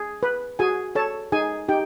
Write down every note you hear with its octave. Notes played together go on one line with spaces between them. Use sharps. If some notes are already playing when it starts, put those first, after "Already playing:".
Already playing: G#4
B4
F#4 G#4 G#5
A4 C#5 A5
D#4 G#4 G#5
D#4 G4 G5